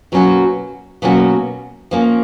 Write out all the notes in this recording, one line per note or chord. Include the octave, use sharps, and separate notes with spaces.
B2 F#3 A#3 C#4 F#4
B2 F#3 A#3 C#4 F#4
F3 A#3 C#4